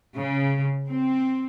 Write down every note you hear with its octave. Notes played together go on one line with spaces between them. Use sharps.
C#3
C4